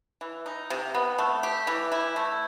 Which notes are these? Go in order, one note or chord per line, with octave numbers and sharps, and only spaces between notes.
E3
D#4
C3
B3
A3
G4
E3
E4
A3